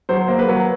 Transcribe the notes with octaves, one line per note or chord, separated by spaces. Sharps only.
F#3 C5
A#3
B4
F#3